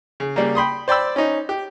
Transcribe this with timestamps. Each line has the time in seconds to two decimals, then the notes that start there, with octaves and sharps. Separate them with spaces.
0.20 C#3
0.36 C#3 G3 A#3
0.55 G5 B5 C6 D#6
0.88 C5 D5 G5 B5 E6
1.16 C#4 D#4
1.49 G4